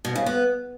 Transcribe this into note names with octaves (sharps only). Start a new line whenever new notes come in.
B2
C#3
B3